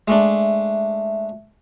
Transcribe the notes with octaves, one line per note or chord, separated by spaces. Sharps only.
G#3 A3 D4 E5